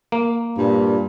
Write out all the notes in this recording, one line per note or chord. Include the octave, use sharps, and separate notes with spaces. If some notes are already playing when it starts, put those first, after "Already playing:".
A#3
G2 A#2